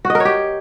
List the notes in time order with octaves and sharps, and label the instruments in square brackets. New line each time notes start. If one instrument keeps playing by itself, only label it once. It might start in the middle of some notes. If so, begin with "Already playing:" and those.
[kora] F#4
D#5
A#4
C#5
G4